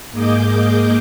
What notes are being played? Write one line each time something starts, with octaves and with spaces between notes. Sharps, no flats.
G#2 A#3 G#4 D#5 D6 G6